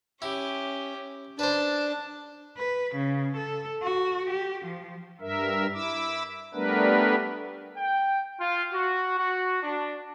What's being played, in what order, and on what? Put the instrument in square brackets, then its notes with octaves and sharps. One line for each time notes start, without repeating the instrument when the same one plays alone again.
[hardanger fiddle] C#4 G4 [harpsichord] E4
[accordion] D4 [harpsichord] B4 C5 [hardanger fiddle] A5
[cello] B4
C#3
A4
F#4
G4
F3
[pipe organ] G2 A#4 E5
E4 D6 E6
G3 A3 B3 D4 A#4 B4
[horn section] G5
F4
F#4
F#4
D4